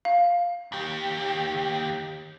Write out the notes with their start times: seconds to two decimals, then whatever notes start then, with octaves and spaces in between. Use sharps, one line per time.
0.05 F5
0.72 D#2 G4